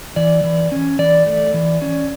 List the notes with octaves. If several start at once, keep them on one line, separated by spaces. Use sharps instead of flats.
E3 D5
E3
C#4
E3 D5
A3
E3
C#4